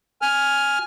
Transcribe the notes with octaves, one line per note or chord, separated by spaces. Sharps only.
G#5 F6